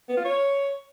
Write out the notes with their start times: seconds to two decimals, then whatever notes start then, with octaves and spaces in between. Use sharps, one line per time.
0.09 B3
0.17 F4
0.25 C#5